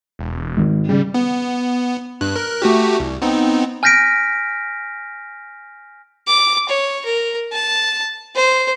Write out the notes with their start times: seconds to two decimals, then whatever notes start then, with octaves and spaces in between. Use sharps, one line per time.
0.19 E1
0.57 G#1
0.89 C#3 G3
1.14 B3
2.21 G2 F#6
2.36 A#4 F#6
2.62 A3 F#4 G4
3.00 C2
3.22 B3 C4 D#4
3.83 G#5 F6 G6 A#6 B6 D7
6.28 D6
6.69 C#5
7.05 A#4
7.52 A5
8.36 C5